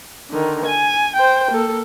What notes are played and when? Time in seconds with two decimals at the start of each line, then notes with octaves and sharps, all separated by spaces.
0.30 D3 D#3
0.66 G#5
1.16 C5 G5
1.51 A#3 A4